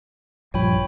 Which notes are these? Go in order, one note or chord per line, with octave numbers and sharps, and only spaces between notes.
A#1 G2 F3 C#5 G5 B5